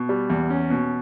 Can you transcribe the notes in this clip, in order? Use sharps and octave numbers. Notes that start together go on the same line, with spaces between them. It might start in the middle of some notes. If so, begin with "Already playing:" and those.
Already playing: B2
G3
E2
C#4
B2